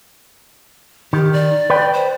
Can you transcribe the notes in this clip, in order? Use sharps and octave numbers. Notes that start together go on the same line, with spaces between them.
D#3 G4
D5
B4 G5
C5